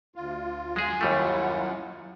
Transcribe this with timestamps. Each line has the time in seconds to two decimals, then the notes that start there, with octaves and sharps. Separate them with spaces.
0.16 D2 F4
0.76 F#2 G#3 G#4 G#5
1.01 D#2 G3 A3 E4 F4 F#5